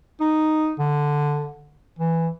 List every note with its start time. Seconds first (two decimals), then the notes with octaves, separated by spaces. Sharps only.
0.21 D#4
0.79 D3
1.99 E3